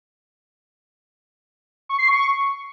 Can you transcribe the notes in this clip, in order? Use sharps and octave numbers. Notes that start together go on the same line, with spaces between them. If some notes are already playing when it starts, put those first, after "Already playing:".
C#6
C7
C#6